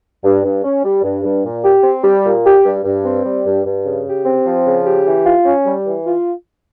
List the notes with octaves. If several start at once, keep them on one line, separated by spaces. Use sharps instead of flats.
G2
G2
C#4
G3
G2
G2
A#2
G4
C4
G3
A#2
G4
G2
G2
C4
G3
G2
G2
C#3
G4
C4
F3
C#3
G4
E3
F4
C#4
G3
E3
F4